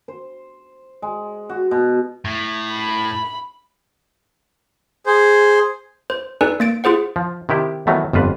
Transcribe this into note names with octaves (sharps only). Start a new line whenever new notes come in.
C5
G#3
F#4
B2
A2
B5
G#4 C5
C5
D#4 A4 B4 D5 G#5
A#3 A6 D7
F4 G#4 C5 F#5
F3
C3 D#3 E4 G4
D#3 E3 F#3 A3 B3
G1 F2 F4 B4